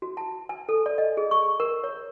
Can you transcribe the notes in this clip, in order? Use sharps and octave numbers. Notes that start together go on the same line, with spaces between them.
F#4
A5
G#5
A4
D5
D#5
G#4
C#6
A#4
C#5